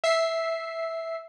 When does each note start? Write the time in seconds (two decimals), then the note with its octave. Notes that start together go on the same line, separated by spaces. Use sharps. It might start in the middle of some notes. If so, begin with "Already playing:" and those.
0.04 E5 C7